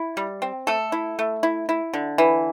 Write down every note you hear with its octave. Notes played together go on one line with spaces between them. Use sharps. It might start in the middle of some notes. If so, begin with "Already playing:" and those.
Already playing: E4
G3
C4
A3 A4
E4
A3
E4
E4
D3
E3